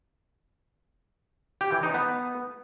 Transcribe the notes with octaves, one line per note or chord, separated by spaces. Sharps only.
G4
E3
D#4
B3